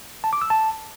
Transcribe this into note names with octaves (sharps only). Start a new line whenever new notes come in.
A5
D6
E6
A5